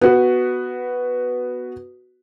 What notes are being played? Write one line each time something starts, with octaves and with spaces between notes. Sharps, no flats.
B3 F#4 B4